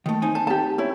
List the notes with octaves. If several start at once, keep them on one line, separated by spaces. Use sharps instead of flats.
D#3 A3
C4 D#4 G#5
A5
G4 A5
E4 C#5